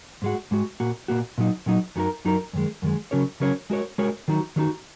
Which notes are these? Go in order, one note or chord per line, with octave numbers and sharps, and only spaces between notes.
G#2 G#3 F#4
G#2 G#3 F#4
A#2 A#3 F#4
A#2 A#3 F#4
A#2 F#3 D#4
A#2 F#3 D#4
F#2 F#3 D#4 F#4 A#4
F#2 F#3 D#4 F#4 A#4
F#2 D#3 G#3
F#2 D#3 G#3
C#3 F#3 C#4 A#4 C#5
C#3 F#3 C#4 A#4 C#5
G#3 F#4 A#4 C#5
G#3 F#4 A#4 C#5
D#3 F#3 D#4 F#4
D#3 F#3 D#4 F#4